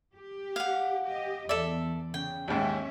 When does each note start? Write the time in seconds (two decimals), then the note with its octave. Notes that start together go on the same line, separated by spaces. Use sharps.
0.15 G4
0.56 F5 F#5
1.04 G4 D#5
1.49 E2 A4 D5 E5
2.14 C#3 G5
2.48 D#2 G#2 C#4 E5